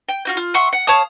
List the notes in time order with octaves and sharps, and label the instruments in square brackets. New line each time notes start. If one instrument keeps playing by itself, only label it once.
[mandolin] G5
F4 F#4 G6
F4
E5 F#5 C6 C#6
F#5
C#5 F5 A5 D#6